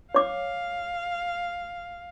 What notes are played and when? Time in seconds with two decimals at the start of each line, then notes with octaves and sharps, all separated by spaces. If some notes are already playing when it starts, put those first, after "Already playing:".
0.15 C#5 F5 D6